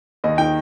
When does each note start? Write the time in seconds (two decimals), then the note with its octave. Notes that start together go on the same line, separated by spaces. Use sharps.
0.24 D#2 D#5
0.38 D#3 G5